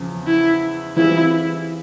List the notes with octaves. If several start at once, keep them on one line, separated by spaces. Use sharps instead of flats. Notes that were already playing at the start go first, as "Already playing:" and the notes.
Already playing: E2 C#3 F3
E4
E3 G3 C4 E4 F4 G#4